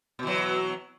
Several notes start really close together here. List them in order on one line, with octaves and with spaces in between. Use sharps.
B2 E3 F#3